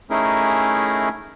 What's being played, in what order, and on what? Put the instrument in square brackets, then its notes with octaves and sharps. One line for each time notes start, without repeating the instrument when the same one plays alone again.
[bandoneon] A3 C#4 D#4 E4 G#4 A#4